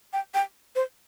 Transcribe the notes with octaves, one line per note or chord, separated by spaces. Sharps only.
G5
G5
C5